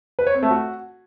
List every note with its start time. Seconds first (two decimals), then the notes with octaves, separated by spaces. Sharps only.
0.19 B4
0.27 C#5
0.35 C4
0.43 A3
0.51 F#4